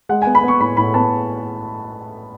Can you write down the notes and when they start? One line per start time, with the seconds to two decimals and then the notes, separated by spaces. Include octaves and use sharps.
0.09 G#3 F#5
0.22 B3 G#5
0.35 B5
0.43 B3 C#6
0.60 A2 B5
0.77 A2 B5
0.94 B3 A5